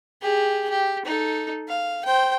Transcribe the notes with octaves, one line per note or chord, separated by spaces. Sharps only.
G4 G#4
G4
D#4 A4
F5
C5 G5